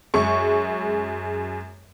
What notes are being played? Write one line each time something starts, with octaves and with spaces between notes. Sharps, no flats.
F#2 G#3 C#6